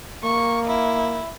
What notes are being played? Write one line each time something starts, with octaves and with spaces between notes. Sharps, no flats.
A#3 C#6
E4